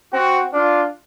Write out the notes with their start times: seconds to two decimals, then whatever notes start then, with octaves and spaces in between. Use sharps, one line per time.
0.13 C4 F#4
0.53 D4 F4